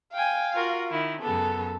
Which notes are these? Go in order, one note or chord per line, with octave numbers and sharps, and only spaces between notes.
F5 G5 G#5
F4 F#4 A#4
D#3 E4
F#2 C#3 B3 A4